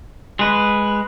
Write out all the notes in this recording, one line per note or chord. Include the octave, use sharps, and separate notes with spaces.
G#3 B4